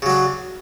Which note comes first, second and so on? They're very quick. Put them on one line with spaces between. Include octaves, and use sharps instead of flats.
C#3 F#3 D4